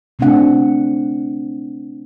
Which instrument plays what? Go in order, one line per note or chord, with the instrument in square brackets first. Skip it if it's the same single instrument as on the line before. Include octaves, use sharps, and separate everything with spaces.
[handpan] C3 A3 C4 D4 F#5